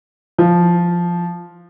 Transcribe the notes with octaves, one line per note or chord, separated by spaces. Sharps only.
F3